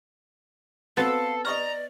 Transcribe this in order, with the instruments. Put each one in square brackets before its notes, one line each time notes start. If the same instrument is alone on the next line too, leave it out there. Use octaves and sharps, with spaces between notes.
[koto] B3 [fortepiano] C4 F#4 [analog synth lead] A4 [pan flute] F5
[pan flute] D5 [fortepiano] D#5 C#6 F6 [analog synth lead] A#5